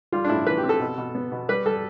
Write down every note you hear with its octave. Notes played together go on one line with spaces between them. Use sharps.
G3 F4
D4
A2 E4
E3 B4
G4
C4
A4
B2
B2
B3
B2
G3 B4
G3 A4